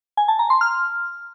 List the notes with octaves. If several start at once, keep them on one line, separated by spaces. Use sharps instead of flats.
G#5
A5
A#5
C6
F6